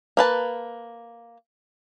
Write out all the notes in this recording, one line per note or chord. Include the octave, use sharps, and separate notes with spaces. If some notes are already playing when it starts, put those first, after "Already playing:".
A#3 B4 A5